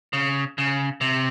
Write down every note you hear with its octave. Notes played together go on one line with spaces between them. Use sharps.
C#3
C#3
C3